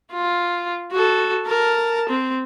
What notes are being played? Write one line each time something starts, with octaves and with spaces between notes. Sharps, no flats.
F4
F#4 A4
A#4 A5
C4